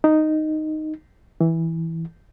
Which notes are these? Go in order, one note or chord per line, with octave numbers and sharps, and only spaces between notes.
D#4
E3